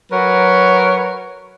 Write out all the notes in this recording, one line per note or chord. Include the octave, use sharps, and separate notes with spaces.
F#3 A#4 B4 C#5